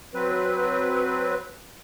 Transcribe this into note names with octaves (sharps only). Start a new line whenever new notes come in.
F#3 C4 B4